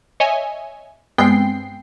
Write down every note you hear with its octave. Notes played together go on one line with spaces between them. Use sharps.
C#5 D#5 E5 G#5
G2 G#3 B3 C4 G5 C7